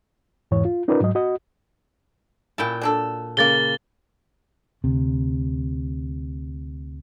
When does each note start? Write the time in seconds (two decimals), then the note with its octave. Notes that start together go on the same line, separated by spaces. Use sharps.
0.51 E2 G#2 E3 C#5
0.65 F4
0.88 C#4 D#4 F4 A#4 B4 D5
1.01 G#2 F#3 D#5
1.15 F#4 D#5
2.58 A#2 C#4 E4 G5 A5
2.81 F#3 D4 A4
3.37 C#3 A#3 A6 G7
4.84 D2 C3